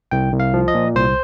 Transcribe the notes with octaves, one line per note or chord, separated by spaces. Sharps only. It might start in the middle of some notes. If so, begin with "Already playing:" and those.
C2 G5
C2
F5
F3
D#5
A#2
C2 C5